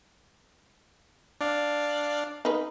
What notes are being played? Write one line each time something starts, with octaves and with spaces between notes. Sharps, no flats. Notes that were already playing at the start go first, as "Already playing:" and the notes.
D4 D5 F5
D#4 B4